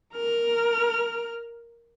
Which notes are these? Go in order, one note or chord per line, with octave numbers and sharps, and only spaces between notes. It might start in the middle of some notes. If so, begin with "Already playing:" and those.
A#4 F6